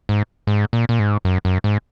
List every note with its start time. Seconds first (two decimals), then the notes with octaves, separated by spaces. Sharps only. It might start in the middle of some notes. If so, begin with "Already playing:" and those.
0.09 G#2
0.47 G#2
0.73 A#2
0.89 A#2
0.99 G#2
1.25 F#2
1.45 F#2
1.64 G#2